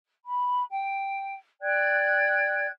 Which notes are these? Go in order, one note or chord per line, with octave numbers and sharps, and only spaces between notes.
B5
G5
D5 G5 F#6 G#6